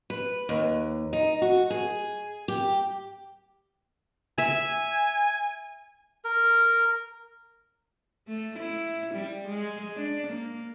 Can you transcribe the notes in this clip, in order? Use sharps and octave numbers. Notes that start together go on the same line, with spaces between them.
B4
D#2
D#4
F#4
G#4
G4
E5 G#5
A#4
A3
E4
G3
G#3
D4
A#3